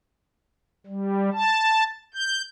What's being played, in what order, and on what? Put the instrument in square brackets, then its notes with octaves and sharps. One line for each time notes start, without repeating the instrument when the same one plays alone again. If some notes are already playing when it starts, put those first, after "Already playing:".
[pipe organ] G3
A5
G6